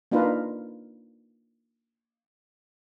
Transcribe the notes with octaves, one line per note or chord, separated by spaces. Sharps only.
A#3 D4 D#4 F4 A#4 B4